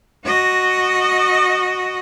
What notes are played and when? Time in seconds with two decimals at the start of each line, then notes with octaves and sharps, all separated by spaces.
0.26 F#4 D#5